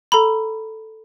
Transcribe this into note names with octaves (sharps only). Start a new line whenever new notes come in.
A4 A#5 B5